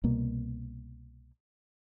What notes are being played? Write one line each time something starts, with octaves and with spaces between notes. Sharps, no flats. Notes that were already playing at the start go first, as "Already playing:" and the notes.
C2 B2 A#3